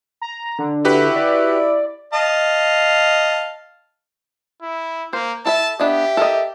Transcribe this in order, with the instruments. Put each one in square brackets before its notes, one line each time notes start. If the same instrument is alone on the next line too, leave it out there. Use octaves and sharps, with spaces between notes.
[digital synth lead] A#5
D3
[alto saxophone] E4 [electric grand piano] F#4 G4 B4
[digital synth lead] D5
[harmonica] D#5 F5 A5
[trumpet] E4
[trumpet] A#3 [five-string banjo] C5
[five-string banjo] E4 A4 E5 [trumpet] A5
[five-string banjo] B3 D4 D#5 [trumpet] G4 [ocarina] E5
[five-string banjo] A4 A#4 D#5